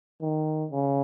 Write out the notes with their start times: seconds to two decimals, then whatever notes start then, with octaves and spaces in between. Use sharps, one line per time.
0.21 D#3
0.71 C#3